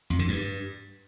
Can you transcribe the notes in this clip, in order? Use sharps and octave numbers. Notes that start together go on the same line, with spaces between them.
F2
D3
G2